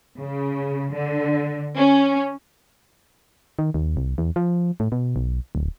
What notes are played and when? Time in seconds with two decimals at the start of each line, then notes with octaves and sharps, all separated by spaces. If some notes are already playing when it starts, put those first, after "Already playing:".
0.19 C#3
0.93 D3
1.77 C#4
3.59 D#3
3.74 D#2
3.97 C2
4.18 E2
4.36 F3
4.80 A2
4.92 B2
5.16 B1
5.55 D1